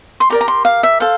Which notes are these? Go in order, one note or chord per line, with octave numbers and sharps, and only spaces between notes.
C6
G4 A#4 D5 A#5
A#5
C6
F5
E5
A4 C5 F5